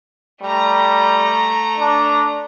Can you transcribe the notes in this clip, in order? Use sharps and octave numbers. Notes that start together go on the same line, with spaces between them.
G3 A3 A#5
D4